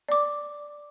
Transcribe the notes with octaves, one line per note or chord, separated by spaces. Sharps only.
D5 D6